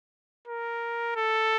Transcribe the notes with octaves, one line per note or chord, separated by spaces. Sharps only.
A#4
A4